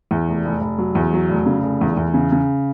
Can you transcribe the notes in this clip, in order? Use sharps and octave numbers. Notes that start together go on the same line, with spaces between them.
E2
F1
F1
F1
F#3
E2
F#3
F1
C#3
F1
E2
E2
C#3
C#3